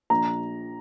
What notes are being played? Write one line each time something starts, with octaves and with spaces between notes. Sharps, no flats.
A#1 A#5